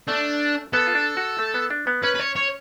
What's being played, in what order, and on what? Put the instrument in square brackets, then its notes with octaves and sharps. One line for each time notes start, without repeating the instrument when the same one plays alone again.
[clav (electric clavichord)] A3 [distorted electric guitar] D4
[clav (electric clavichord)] B3 [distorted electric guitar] A4
[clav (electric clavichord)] F4
D4
F#4
A3
B3
D4
B3
[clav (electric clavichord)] C#4 [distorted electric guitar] B4
[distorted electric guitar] B4
C#5
C#5